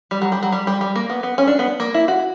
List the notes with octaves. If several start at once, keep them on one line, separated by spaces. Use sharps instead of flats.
G3
F#3
G3
F#3
G3
G3
G3
A#3
B3
B3
C#4
D4
B3
A#3
E4
F#4